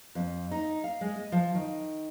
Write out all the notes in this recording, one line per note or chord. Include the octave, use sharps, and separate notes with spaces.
F2
D#4
F5
G#3
D#5
F3
D#3